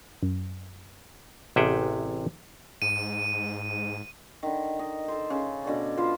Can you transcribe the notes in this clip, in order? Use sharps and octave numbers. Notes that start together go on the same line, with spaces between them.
F#2
A1 C3 G#4 E5 F#5 G5
G#2 D#7
D3 D#3
D#5
A4 C5
C#3
B2 D3 C#5 D5
F3 F4 B4 C5